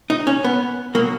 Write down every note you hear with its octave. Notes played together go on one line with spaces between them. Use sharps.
D#4
C#4
B3
B2 F#3 A#3